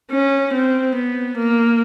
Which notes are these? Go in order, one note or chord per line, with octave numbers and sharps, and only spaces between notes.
C#4
C4
B3
A#3